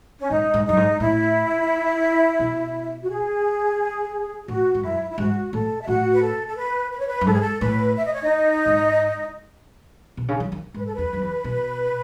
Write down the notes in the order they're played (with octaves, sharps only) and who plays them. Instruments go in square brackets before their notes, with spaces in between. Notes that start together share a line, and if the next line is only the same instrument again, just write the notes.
[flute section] C#4
[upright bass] G#2 [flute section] D#4
[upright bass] G#2
[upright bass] F#2 [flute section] D#4
[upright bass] G#2
[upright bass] A2 [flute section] E4
[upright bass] B2
[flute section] F#4
G#4
[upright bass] A2 [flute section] F#4
[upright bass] G#2
[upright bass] F#2 [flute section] E4
[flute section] E4
[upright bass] G#2 [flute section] F#4
[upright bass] A2 [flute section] A4
[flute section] E5
[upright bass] A2 [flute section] F#4 F#5
[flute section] B4
A4
A4
B4
B4
C#5
B4
[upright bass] F#2
[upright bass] G#2 [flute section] A4
[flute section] G#4
A4
[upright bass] A2 [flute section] B4
[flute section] E5
D#5
C#5
D#4 D#5
[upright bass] G#2
B2
C#3
E3
D#3
[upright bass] G#2 [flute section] B4
[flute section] A4
[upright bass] E2 [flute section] B4
[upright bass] F#2
E2
B2